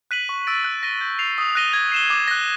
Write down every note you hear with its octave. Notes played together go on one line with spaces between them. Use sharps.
F#6 B6 D#7 F#7
C#6
E6 A6 D7
F#6
A#6 D#7 G7
G6
C7 F7
D#6
F#6 A#6 D#7 G7
G#6
C7 E7 G7
D6
F#6 A#6